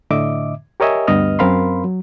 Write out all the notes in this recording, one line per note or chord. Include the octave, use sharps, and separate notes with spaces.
A2 D3 D#5 E5 D6
G4 A#4 C#5 D#5 E5 G#5
D2 G2 B3 D#5 D#6 F6
F#2 C4 A#4 F5 B5 C6
F#3